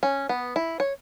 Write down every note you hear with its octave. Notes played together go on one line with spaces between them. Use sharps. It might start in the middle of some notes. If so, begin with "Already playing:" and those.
C#4
B3
E4
C#5